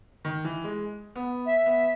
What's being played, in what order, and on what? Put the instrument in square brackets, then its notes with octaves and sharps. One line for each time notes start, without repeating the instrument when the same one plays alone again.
[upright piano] D#3
E3
G#3
B3
[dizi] E5
[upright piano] B3